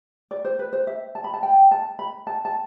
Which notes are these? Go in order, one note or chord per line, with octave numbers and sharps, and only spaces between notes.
D5
C5
B4
C5
E5
A5
B5
A5
G5
A5
B5
A5
A5